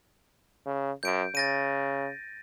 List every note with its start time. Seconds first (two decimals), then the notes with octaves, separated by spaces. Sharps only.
0.66 C#3
1.03 F#2 G6 D7
1.35 C#3 A6 A#6 D#7